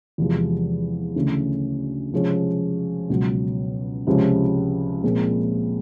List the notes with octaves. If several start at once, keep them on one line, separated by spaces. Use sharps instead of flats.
E2 C3 F3 G#3
D2 C#3 E3 A3 C#4
C3 F3 G#3 C#4
C#2 B2 F#3
C#2 C3 F3 G#3 C#4
A#2 F3 G#3 C4